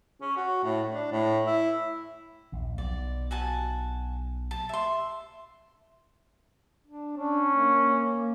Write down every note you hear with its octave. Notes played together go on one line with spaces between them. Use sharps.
C#4
F#4
A2
D4
A2
E4
A#1 D#2
B1 D5
F#4 G#5 A5
A5
E5 C6
D4
C#4 D4
A#3